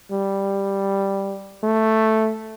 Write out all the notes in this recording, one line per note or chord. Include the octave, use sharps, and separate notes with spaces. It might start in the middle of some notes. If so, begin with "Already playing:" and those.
G3
A3